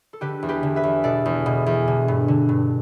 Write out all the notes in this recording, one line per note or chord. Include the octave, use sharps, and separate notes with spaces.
A4
D3 G4 B4
E2
G4 B4
D3
B4 E5
E2
B2 A4 D5
E2
B2
E2
D3
G2
D3
G2